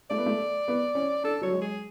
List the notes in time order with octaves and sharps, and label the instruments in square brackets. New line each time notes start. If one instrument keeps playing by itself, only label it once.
[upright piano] A3 [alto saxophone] D5
[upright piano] B3
A3
B3
C#4
[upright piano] D4 [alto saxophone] A4
[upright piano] F#3 [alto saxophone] C#5
[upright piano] G#3
[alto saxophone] G#4